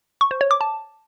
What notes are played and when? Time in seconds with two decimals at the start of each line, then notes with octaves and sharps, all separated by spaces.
0.21 C#6
0.31 C5
0.41 C#5
0.51 D6
0.61 A5